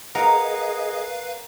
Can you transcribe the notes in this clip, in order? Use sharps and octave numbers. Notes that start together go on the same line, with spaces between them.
G#4 A#4 B4 D#5 F5 F#5 A#5